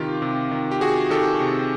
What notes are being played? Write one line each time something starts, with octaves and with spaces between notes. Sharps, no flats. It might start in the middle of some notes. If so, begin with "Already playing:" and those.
Already playing: C3 D#3 F4 G4
C3
D#3
G4
C3 F#4 G#4
D#3 G4 A4
C3